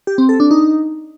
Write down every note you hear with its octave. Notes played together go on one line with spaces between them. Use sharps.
G4
C4
A4
D4
D#4